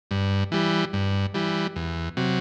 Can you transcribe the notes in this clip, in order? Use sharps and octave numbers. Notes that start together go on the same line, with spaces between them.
G2
E3 G3
G2
E3 G3
E2
C3 F#3